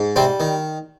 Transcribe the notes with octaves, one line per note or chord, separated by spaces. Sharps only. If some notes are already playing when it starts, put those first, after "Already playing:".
Already playing: G#2
C3 G3 C4
D#3